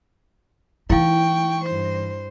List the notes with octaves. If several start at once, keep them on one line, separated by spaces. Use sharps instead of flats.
E3 D#4 E4 F5 G5 C#6
G2 C5